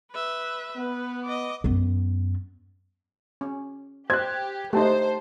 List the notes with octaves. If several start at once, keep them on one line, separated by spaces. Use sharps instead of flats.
B4 E5
B3 B4
D#5 D6
F#2 B3
C#4
G4 C5 F#6 G#6
A3 D#4 G4 C5 A5